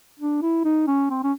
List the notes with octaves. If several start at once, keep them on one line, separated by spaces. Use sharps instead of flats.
D4
E4
D#4
C#4
C4
C#4